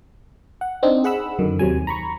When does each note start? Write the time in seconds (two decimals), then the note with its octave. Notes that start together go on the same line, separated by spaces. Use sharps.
0.61 F#5
0.83 C4 D4 D#4
1.04 G#4 F#5 B5 E6
1.39 F#2 D3 D#3
1.59 D#2 C3 F#3 G#5
1.87 A#5 B5 C#6